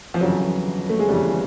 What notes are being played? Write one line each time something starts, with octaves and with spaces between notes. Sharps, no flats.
F3
G1 F2 C#3 E3 F#3
A3
G#3
G1 F2 C#3 E3 G3